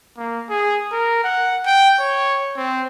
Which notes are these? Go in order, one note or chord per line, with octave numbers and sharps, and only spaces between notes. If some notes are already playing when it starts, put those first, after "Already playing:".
A#3
G#4
A#4
F#5
G5
C#5
C4